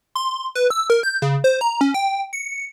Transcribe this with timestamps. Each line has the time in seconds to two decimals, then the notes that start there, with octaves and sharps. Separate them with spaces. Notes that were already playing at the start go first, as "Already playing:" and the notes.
0.15 C6
0.55 B4
0.70 E6
0.90 A#4
1.03 G6
1.22 C#3
1.44 C5
1.61 A#5
1.81 C#4
1.94 G5
2.33 C#7